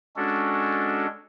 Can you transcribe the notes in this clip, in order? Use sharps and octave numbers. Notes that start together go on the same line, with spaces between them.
G#3 C#4 D4 F#4 A4